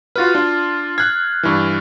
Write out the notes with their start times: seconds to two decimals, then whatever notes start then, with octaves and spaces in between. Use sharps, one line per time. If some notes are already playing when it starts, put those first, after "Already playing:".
0.16 F4 F#4 B4 F6 A6
0.35 D4 F4
0.98 F6 F#6 G#6 C7
1.43 G2 E3